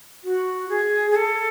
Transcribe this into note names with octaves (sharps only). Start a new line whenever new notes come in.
F#4
G#4
G#4
A4